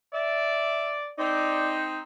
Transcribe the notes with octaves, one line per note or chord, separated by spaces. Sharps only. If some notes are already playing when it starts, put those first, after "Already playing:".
D5 E5
C4 D#4 D5